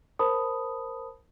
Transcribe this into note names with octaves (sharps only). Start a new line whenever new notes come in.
A#4 C5 A5 B5 D#6